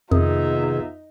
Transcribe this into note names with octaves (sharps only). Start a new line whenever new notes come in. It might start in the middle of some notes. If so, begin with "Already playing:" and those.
F2 C3 D#3 B3 D#4 F4 G#4 E5